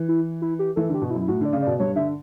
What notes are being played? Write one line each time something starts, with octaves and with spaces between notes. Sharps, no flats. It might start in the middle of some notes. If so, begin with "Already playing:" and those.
Already playing: E3
E4
E4
G4
E3 A4
D3 G4
B2 F#4
E4
F#2
E4
A2 F#4
D3 D5
C#3
B2 D5
G2 C#5
D3 E5